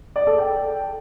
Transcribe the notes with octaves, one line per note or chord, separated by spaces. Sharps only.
D5
A4
G5